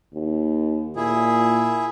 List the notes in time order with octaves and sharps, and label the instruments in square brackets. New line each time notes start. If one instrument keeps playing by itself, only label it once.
[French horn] D#2
[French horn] A#2 [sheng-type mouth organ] E4 G#4